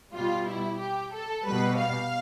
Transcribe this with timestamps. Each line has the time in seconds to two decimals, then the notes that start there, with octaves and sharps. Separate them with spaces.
0.13 B2 G3 F4
0.46 E4
0.78 G4
1.12 A4
1.45 B2 G3 B4
1.78 F5